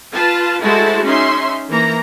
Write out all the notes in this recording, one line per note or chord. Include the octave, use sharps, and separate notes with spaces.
F4 B4 F5 A5
G#3 A3 E4 F#4 C5 A5
C#4 D#4 E5 C6
E3 A#3 A#5